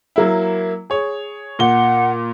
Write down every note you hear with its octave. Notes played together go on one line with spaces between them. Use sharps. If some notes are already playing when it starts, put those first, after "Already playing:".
F#3 A#3 E4
G#4 C#5
A#2 F#5 G7